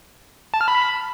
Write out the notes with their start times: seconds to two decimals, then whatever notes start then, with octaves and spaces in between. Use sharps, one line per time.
0.54 A5
0.61 F6
0.68 B5